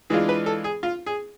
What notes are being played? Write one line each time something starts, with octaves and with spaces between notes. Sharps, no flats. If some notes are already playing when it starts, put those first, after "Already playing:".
E3 G#3 D4 F4 G#4
B4
A4
G#4
F4
G#4